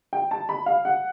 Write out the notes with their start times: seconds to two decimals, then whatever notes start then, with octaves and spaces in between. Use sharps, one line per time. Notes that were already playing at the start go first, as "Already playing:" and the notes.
0.13 G5
0.31 A5
0.49 B5
0.66 F5
0.85 F#5